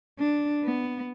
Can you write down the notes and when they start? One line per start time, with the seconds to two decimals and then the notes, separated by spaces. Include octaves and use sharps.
0.19 D4
0.64 B3